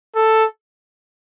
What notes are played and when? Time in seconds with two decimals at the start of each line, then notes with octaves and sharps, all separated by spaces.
0.15 A4